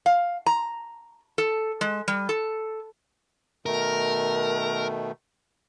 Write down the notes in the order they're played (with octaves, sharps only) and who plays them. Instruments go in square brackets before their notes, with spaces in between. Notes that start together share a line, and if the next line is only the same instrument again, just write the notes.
[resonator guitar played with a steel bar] F5
A#5
A4
G#3
G3
A4
[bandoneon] B2 D#3 A3 [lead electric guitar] A#4